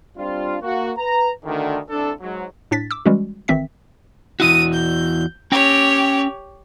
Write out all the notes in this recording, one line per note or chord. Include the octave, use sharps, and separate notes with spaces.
G3 C4 D4 F4
A#3 F#4
B4 A#5
D2 D3 D#3
C2 D4 A4
G#2 F#3
A2 D4 A6 B6
D6 E6
E3 G3 G#3 C#4 F#4
G#1 D#3 E3 C4 E5 B6
E2 E4 F#4 D#6 D#7
G6
C#4 G4 C#5 G5